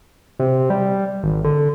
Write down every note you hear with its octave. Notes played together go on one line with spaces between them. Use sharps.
C3
G3
G#1
D3